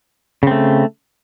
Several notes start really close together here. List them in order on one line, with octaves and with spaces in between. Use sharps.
C#3 C4 A3